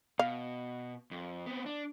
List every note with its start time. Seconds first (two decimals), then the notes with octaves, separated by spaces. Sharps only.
0.19 B2 F5
1.11 F2
1.46 B3 C4
1.66 D4